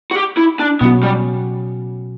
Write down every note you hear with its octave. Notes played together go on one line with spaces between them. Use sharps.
F#4
G4
E4
D4
B2 F#3 B3 C#4 F#4
G3